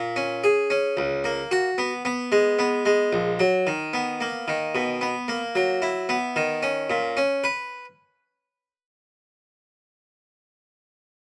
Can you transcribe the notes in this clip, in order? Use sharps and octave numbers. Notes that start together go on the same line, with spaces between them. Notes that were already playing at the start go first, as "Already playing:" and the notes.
Already playing: A#2
C#4
G#4
C#4
C#2
A#3
F#4
B3
B3
G#3
B3
G#3
A#1
F#3
D#3
B3
A#3
D#3
B2
B3
A#3
F#3
E4
B3
D#3
C#4
A#2
C#4
B4